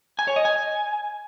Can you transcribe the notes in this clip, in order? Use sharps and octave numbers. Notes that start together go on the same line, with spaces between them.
G#5
C#5
D#5
G#5